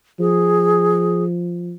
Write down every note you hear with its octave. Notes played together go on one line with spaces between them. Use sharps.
F3 G#4